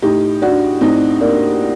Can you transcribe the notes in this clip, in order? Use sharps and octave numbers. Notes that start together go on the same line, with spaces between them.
A2 D#4 G4
D4 F#4
A2 C4 D#4
A#3 D4